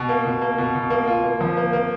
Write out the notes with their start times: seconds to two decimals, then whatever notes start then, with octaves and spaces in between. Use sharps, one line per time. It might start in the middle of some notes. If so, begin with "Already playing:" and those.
Already playing: B2
0.09 A#3
0.25 B2
0.41 A#3
0.58 B2
0.75 B2
0.90 A#3
1.07 F4
1.24 A#3
1.41 F3
1.57 A#3
1.73 A#3